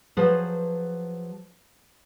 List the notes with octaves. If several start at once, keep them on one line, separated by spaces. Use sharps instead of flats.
F3 F#3 G#4 B4 C5